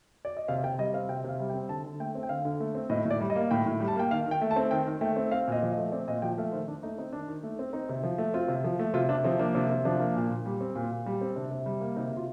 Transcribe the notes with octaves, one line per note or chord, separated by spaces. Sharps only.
D5
D#5
C3 F5
C3 G5
G3 D#5
C4 F5
C3 G5
C3 F5
G3
G5
C4
D3 A5
D3
A3 G5
C4
G5
D3 F5
D3
A3
C4
A2 D#5
A2
D5
G3
D#5
A#3
A2 G5
A2
G3
A5
A#3 G5
D#3 F5
D#3
G5
A3
A5
C4
D#3 G5
D#3
A3 G5
C4
C4 F5
A#2 D#5
F3
D#5
A3
C4 D5
A#2 D#5
F3 G5
A3 F5
D#3 C5
D#3 D4
A3 D#4
C4 D#4
D#3 D4
D#3
A3
C4
C4 D#4
C3
F3
A3
C4 F4
C3
F3
A3
C3 F4
C3 D4
F3 C4
A#3 D4
C3 D4
C3
F3 D4
A#3
A#2
A#2
G3
C4
A#2
A#2
G3
C4
C3 D4
C3
G3
A#3
C3 D#4
C3
F4